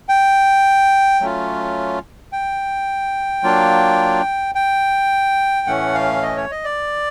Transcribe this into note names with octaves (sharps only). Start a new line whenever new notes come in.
G5
F#3 A3 C#4 F4
G5
F#3 A#3 D4 F4
G5
A2 E3 A3 C#4 F#5
F5
D#5
C#5
D#5
D5